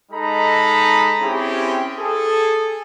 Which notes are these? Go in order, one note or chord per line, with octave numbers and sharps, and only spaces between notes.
G#3 D#4 A4 A#5 B5
C4 C#4 E4 G4 G#4
G#4 A4